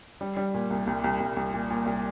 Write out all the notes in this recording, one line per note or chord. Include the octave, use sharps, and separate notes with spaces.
G3
G3
A#2
C2
C2
C2
C2
C2
A#2
A#2
C2